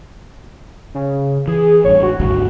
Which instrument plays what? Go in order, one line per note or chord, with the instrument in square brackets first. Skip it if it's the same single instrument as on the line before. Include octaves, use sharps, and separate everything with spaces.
[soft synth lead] C#3
[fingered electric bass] E3 [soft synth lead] G#4
[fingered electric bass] A1 G2 [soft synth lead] C#5
[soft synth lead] F#4
[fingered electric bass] G#1 D2 G2